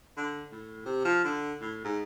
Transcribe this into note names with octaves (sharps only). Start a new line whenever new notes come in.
D3
A2
C3
F3
D3
A2
G#2